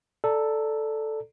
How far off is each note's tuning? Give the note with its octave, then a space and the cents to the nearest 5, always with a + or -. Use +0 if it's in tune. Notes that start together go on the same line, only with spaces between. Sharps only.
A4 +0 D5 +0 A#5 -20